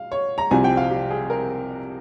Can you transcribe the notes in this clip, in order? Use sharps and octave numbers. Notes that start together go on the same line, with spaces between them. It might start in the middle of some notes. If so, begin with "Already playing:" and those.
Already playing: F5
C#5
A#5
C2 C3 F3 C4 G#5
G5
F5
G4
G#4
A#4